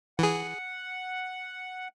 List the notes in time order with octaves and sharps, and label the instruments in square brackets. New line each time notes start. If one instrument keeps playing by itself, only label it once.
[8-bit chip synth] E3 G#4 [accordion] F#5